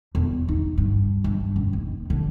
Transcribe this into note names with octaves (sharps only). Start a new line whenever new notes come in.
E2
D#4
G2
G2
F#2
D#2
D3